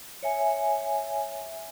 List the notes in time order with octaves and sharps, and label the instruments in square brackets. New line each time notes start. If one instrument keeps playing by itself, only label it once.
[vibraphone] C#5 E5 G#5